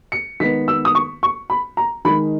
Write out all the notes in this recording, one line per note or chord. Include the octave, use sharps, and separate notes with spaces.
C#7
D#3 G#3 B3 D#4 B6
E6
D#6
C#6
C#6
B5
A#5
D#3 G#3 D#4 B5